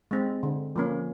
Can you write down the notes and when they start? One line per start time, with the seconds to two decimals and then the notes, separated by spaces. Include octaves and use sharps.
0.11 G#3 C4
0.43 D3
0.76 F3 A#3 C#4